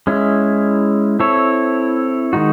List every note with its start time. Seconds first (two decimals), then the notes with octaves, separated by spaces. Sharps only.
0.07 G#3 C#4 E4
1.20 C4 E4 A4 C#5
2.33 D#3 G#3 D#4 F#4